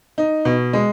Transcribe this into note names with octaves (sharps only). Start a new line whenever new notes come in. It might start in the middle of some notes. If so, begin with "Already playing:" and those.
D#4
B2
G#3